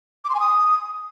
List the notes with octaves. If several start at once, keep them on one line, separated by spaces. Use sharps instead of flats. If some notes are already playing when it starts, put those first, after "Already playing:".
D6
C6
G#5
D#6